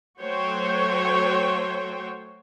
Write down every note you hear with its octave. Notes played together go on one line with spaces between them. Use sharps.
F#3 A3 F#4 C5 C#5 G5